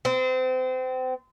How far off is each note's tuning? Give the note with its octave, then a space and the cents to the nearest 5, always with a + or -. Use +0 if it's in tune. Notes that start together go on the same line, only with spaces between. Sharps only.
C4 -30